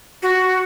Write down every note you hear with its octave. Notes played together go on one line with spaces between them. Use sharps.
F#4